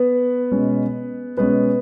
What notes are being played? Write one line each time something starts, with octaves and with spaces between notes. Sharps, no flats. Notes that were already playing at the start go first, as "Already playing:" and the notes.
Already playing: B3 B4
B2 G#3 C#4
B2 G#3 B3 C#4 B4